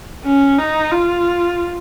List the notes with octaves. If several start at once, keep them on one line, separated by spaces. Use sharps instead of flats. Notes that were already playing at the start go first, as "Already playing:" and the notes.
C#4
D#4
F4